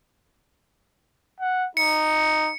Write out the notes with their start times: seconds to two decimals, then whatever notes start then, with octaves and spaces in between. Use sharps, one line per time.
1.41 F#5
1.77 D#4 C#7